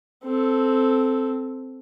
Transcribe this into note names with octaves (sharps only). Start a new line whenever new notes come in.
C4 A4